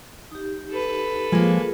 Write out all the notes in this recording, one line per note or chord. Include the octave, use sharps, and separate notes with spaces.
D#4 G4
A4 B4
F3 G#3 A#3 F4 G#4 A#4